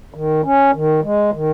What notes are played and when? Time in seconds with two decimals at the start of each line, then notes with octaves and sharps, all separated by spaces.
0.14 D#3
0.44 C#4
0.73 D#3
1.03 G#3
1.33 D#3